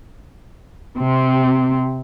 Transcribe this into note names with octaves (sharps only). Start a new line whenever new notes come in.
C3 C4